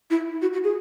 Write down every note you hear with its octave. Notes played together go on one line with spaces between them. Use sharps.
E4
F#4
F#4
G#4